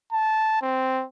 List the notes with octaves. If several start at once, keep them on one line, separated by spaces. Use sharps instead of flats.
A5
C4